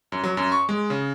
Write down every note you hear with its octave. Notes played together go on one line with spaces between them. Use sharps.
F#2
F#3
F#2
C#6
G#3
C#3